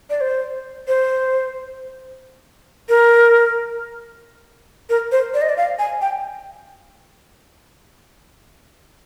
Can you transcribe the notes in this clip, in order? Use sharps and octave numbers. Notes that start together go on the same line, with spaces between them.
D5
C5
C5
A#4
A#4
C5
D5
D#5
D5
F5
G#5
G5